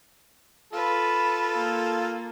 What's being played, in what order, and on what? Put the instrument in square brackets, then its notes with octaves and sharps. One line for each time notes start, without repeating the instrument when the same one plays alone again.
[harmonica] F4 A4 [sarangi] B4
[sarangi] A#3